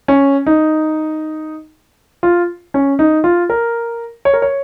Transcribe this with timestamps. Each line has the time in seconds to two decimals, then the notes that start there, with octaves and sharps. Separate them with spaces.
0.08 C#4
0.46 D#4
2.23 F4
2.74 C#4
2.99 D#4
3.24 F4
3.50 A#4
4.25 C#5
4.34 A#4
4.42 C#5